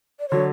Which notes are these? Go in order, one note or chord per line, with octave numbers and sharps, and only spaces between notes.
D5
D3 F#3 C#5